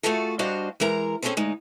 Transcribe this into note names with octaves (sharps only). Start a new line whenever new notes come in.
A3 C4 F4 F#4 G#4 A4
G3 D4 F#4 C5 D#5 F5
E3 G#3 A#4 A#5
C4 C#4 F#4 G#4 A4 C5
D2 G#3 D#4